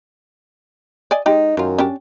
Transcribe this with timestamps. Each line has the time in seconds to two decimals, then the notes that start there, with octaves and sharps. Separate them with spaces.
1.11 D5 D#5 G#5
1.26 G#3 D#4 G4
1.57 F#2 D#3 F4
1.79 C#4 D4 G4